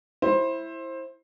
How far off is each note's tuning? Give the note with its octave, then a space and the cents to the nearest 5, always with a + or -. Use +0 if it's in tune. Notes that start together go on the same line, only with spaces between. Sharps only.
E4 +0 C5 +20